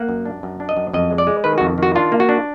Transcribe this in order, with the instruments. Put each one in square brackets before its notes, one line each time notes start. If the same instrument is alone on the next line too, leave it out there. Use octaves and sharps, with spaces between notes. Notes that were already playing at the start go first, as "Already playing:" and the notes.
Already playing: [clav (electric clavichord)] A#3 F#5
F#2
D4
F#2
D4
D#5
F#2
F2 D#5
G#3
D5
G#3
D#3 B4
F2 F#4
D#3 F#4
D4 F4
A#3
F#4
D4